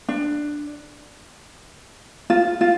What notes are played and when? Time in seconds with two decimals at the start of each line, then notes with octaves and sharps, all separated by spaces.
0.09 D4
2.30 F4
2.61 F4